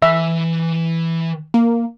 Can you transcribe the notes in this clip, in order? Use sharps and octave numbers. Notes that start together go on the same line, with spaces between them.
E3 E5 G#5
A#3